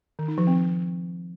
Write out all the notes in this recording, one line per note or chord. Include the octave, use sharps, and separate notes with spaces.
D#3
D#4
F3
C4